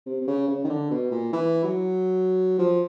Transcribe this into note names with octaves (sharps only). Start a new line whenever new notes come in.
C3
C3
C#3
C#3
D#3
D3
B2
A#2
E3
F#3
F3